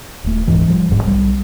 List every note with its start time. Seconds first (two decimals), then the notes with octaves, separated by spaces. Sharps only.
0.24 D#1 A3
0.47 F1 C#2 G#2 E3
0.68 F3 G3
0.89 D#1 G#1 G#2 G3
1.04 B1 G3